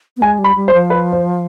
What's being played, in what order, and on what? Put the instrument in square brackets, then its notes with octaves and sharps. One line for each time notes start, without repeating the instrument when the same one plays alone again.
[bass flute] B3
[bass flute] G#3 [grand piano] G#5
[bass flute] G3
[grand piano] B5
[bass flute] G3
[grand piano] C5
[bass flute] F3
[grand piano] B4
C5